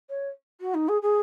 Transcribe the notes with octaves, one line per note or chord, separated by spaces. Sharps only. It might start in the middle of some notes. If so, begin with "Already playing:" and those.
C#5
F#4
D#4
G#4
G#4